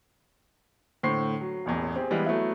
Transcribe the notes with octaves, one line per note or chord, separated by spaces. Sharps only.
A2 D3 C5 C7
F#3
E1 A1 E2
C4 G4 G#4
E3 G3 G#3 B3
F#3 A3 B3 E4